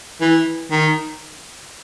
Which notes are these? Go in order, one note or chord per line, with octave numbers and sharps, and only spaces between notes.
E3
D#3